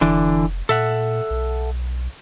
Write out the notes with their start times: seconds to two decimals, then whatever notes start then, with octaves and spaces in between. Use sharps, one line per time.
0.01 F1 D3 E3 D4
0.69 A#2 A4 E5 F#5
1.30 B1